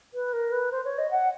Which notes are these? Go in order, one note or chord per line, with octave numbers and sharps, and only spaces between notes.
B4
A#4
B4
C5
C#5
D#5
F#5